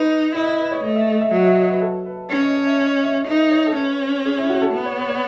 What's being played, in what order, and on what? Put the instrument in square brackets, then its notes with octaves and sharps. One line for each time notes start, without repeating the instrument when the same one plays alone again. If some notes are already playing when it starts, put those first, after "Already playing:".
Already playing: [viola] D#4 [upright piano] B4
[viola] E4 [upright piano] D#5
[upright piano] D#5
B4
C#5
[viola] A3 [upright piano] D#5
[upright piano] E5
D#5
E5
[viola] F#3 [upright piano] D#5
[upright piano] E5
D#5
B4
A4
B4
[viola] C#4 [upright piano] C#5
[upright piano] D#5
D#5
E5
D#5
D#5
E5
D#5
[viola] D#4 [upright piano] B4
[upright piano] C#5
A4
[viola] C#4 [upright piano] B4
[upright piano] G#4
E4
F#4
A4
[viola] B3 [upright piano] B4
[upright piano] C#5
C#5
C#5